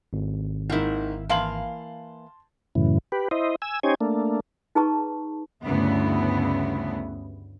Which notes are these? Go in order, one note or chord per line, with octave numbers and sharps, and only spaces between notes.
G#1
G#2 D#3 A#3 E4
E3 A#3 F5 A5 C6 F#7
F#2 A2 C#3 E3
G4 B4
E4 C5 D#5
G#5 E6
C#4 D#4 G4 C5 C#5 G#5
A3 A#3 D4
D#4 G#4 B4 A5 A#5 C#6
D2 G2 C#3 B3 E4